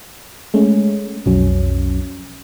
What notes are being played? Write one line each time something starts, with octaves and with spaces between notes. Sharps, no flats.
G#3 A3 C#4
B1 F2 F#3 C#4